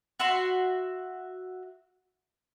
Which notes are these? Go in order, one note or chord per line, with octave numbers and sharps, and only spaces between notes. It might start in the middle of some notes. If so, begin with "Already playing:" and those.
F#4 E5 C6